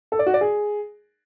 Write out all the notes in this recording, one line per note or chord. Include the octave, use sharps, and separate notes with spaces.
A4
D5
F#4
D5
G#4